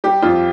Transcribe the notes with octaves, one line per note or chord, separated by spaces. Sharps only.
G3 G4
F2 F4